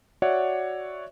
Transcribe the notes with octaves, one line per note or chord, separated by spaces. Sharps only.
F#4 C#5 D5 E5 F#5